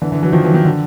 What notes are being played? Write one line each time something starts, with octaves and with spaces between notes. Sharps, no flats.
D3 E3
D3 E3
E3 F#3
D#3 F3
E3 F#3
D#3
D3